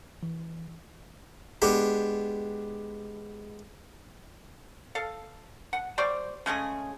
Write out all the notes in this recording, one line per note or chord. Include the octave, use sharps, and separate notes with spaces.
E3
G#3 B3 D4 G4
A4 F5
F#5
G3 C5 D5 C#6
C#3 G#3 A3 G#4